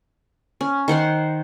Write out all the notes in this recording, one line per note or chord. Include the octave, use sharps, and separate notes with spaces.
C#4
D#3 C5 F#5 C6